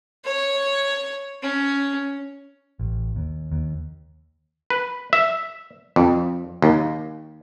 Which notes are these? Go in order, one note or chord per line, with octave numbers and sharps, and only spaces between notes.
C#5
C#4
A1
D#2
D#2
B4
E5
F2
D#2